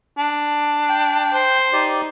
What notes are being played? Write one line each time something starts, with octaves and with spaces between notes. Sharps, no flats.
D4
G5
C5
D#4 G4 D5